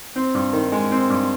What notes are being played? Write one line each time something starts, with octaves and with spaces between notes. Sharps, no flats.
C4
G2
D#3
G#3
C4
G2